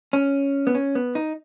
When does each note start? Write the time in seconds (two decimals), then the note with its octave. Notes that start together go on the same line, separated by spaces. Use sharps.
0.13 C#4
0.67 B3
0.75 C#4
0.95 B3
1.15 D#4